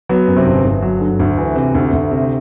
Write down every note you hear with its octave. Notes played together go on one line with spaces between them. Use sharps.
F#3 B3
F#2
C3 C4
G1
G1
F#3
D3
D2
E3
C3
D2
D2
C3